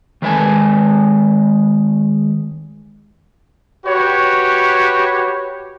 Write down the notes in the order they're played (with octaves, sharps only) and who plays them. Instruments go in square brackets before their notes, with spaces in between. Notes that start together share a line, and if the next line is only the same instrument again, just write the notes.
[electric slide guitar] D#3 G#3 B4 D#5 G#5 A5
[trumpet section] F#4 G4 B4 C#5